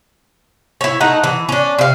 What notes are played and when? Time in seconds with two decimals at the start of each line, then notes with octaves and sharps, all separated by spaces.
0.81 E4 C#5
1.00 A3 D#4 F#5
1.23 E3
1.49 C#4 D4
1.79 C3 F5